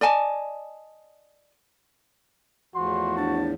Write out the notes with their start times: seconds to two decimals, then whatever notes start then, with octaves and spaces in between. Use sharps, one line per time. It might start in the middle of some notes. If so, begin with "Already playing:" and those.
0.01 D5 D#5 G#5 A5
2.75 E2 A2 F3 F#4 C6
3.17 D4 A5